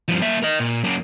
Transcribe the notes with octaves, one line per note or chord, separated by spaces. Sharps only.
G2 F3
A#3 E5
A#4 D#5
A#2
F#2 A#3